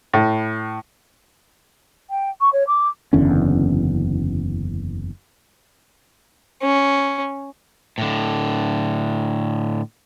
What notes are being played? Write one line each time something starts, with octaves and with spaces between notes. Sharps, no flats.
A2
G5
C#6
C#5
D6
F#1 E2 D3 C#4
C#4
A2 D3